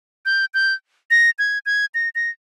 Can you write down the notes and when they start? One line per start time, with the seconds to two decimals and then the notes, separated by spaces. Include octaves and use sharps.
0.26 G6
0.54 G6
1.11 A#6
1.39 G#6
1.66 G#6
1.94 A#6
2.15 A#6